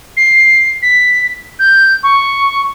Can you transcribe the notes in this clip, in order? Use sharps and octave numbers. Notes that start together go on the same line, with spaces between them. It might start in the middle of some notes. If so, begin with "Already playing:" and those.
C7
B6
G6
C#6